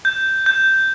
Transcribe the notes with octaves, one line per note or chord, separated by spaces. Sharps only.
G6
G6